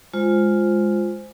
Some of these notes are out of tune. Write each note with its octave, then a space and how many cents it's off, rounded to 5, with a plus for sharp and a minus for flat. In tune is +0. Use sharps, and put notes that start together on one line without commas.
G#3 +0 F4 +0 C5 +0